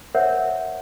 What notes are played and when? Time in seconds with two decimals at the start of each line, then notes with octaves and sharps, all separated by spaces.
0.15 A#4 C5 C#5 E5 F#5 G6